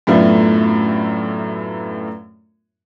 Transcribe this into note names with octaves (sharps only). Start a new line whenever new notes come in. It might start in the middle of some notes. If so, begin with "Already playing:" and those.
F#2 A2 A3 B3 D4 F4